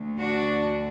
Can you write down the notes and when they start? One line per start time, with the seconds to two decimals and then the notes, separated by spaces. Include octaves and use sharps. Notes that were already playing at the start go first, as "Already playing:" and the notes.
Already playing: D2 D3
0.18 D4 F#4